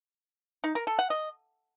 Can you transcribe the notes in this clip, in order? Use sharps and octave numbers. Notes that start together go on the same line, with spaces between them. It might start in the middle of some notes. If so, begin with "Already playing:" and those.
D#4
A#4
A4
F#5
D#5